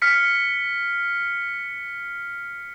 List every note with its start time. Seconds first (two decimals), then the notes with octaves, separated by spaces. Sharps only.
0.02 F6 B6 C#7